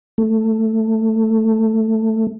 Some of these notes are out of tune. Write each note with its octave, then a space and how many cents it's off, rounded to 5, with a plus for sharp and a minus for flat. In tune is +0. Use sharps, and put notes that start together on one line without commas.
A3 +10